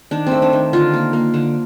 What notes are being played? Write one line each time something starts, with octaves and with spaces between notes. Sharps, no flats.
D#3 D4
C4
A3
D4
D#3
D3 F4
A#3
A#3
D3